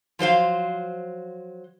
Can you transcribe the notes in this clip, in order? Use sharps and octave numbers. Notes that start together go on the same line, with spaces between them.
F3 F#3 C5 F5